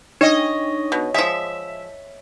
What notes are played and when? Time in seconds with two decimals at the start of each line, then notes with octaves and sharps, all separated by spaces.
0.21 D4 D#4 C#5 D#5
0.92 B2
1.14 F3 G#3 E5 B6